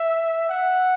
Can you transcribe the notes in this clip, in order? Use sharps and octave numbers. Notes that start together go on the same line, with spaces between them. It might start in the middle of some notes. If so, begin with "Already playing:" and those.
Already playing: E5
F#5